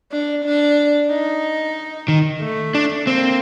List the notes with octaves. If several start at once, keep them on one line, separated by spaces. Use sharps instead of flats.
D4
D4
D#4
D#3
A3
D4
A#3 C4